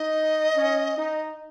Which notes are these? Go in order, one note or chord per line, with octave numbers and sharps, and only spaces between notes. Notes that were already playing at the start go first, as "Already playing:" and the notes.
Already playing: D#4 D#5
C#4
D#4